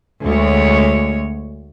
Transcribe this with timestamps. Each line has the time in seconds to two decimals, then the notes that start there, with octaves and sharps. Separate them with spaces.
0.24 D2 G#3 C#5